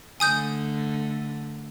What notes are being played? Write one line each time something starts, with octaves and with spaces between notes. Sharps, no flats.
D3 A3 G#5 D#6 G6